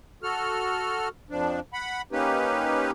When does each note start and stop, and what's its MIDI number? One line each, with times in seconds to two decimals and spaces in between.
0.23 1.08 66
0.23 1.08 69
0.23 1.08 89
1.30 1.60 41
1.30 1.60 53
1.30 1.60 62
1.73 2.01 78
1.73 2.01 83
2.12 2.91 58
2.12 2.91 61
2.12 2.91 63
2.12 2.91 67
2.12 2.91 71